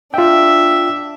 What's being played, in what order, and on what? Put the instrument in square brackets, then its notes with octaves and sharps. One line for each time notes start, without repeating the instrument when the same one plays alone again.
[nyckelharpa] D4 E5 [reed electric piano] F4 G5